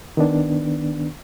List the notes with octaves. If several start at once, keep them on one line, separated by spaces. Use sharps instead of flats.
D#3 B3 D4